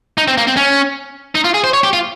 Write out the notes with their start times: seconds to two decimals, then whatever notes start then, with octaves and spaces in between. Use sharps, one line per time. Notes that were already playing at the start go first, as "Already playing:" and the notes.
0.18 D#4
0.28 C4
0.38 A#3
0.47 C4
0.57 C#4
1.35 D#4
1.44 F4
1.54 G#4
1.64 C5
1.73 C#5
1.83 G4
1.93 F4